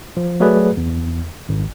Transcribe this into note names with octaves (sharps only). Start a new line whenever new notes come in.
F3
F#3 A3 F#4 G#4 B4 D5
E2
G#1